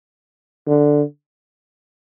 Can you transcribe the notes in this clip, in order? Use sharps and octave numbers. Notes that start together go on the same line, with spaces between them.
D3